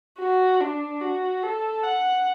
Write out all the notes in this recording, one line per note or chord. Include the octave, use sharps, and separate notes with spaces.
F#4
D4
F#4
A4
F#5